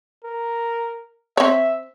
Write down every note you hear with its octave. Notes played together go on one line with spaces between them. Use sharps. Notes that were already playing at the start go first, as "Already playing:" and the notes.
A#4
C4 C#5 E5